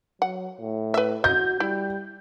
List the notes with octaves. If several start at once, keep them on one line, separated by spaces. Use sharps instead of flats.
F#3 F#5
A2
B4 E5
F#4 D#5 G6
G3 E4